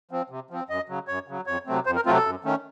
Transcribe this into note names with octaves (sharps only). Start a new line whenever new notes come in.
F3 C4
C3
F3 C4
F#2 D#5
C#3 F#3
F#2 C#5
C#3 F#3
F2 C#5
C3 F#3 A3 C4
F2 C5
A#4
C3 F#3 A3 C4 F4
A4
F#2
D#3 A3 C#4